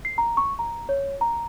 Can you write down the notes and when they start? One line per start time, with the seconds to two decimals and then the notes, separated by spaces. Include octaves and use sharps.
0.05 C7
0.18 A#5
0.37 C#6
0.59 A#5
0.89 C#5
1.21 A#5